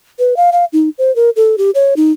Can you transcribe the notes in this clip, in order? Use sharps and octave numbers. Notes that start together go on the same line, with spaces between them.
B4
F5
F5
D#4
C5
A#4
A4
G4
C#5
D#4